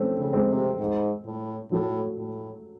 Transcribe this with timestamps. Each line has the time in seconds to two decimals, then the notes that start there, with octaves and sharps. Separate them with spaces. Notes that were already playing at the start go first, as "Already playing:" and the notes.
Already playing: A3 C4 C#4
0.18 C#3
0.33 G#3 C4
0.49 C3
0.79 G#2
1.26 A2
1.71 A2 F#3 A3
2.18 A2